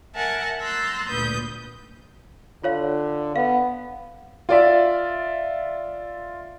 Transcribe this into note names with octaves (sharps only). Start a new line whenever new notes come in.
A#4 E5 F#5 G#5 A5
A#5 C6 E6 F#6 G6 A6
D2 A#2 B4 D#6 G6
D3 F4 C#5 F5
B3 F5
F4 D5 E5